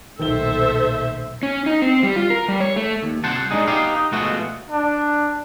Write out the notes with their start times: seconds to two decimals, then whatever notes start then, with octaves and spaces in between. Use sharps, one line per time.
0.19 B1 A#2 D#3 A4 C5 E5 G7
1.43 C#4
1.66 D#4
1.82 C4
2.03 G3
2.16 F4
2.30 A#4
2.48 G3
2.60 C#5
2.76 A3
3.02 D#2
3.24 C2 C3 C5 F#5 A5
3.50 G#3 A3 D4 D#4 G#4
3.67 B3 D#4 G4 F5
3.94 D#4
4.12 B2 F3 G#3 A3 B3 F#4
4.70 D4